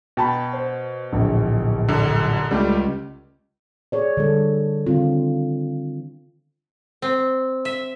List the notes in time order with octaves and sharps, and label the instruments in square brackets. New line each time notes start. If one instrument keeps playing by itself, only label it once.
[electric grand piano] B2 [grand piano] G5 A5 B5
[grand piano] C5
D1 A#1
[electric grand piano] F#2 D3
[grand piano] C#2 [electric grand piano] G3 A3 G4
[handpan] G#4 C#5 D5
D3 G3 A4
D3 D#3 C4 F4
[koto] C4
E5